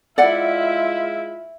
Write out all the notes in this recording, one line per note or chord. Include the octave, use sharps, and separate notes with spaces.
G#3 E4 F4 D5 E5 F#5